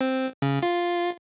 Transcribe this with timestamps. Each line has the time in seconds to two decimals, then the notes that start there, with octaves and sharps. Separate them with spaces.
0.01 C4
0.42 C#3
0.63 F4